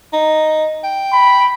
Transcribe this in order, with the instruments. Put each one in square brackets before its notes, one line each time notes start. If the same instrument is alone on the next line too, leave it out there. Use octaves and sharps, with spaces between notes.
[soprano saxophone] D#4
G5
[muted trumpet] B5